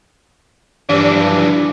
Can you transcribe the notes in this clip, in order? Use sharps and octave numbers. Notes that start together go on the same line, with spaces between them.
G2 E3 F3 D4